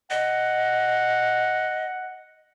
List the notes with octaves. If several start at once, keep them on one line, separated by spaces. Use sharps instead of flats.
D#5 F#5